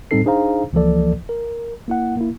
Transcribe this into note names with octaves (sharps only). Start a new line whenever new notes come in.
A2 G3 C4 D#4 A4 C7
D4 D#4 G#4 C5 F5 A#5
C#2 E3 F3 A#3 A4 D5
A#4
A#3 E4 F#5
A#3 E4